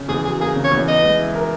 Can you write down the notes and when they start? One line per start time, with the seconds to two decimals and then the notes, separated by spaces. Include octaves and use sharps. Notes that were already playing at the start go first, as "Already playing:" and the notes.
Already playing: C#3
0.08 E2 G#4
0.24 F#3 G#4
0.40 A#3 G#4
0.56 C#3
0.64 C#5
0.72 E2
0.87 B3 D#5
1.03 G#3
1.19 E4
1.35 A#4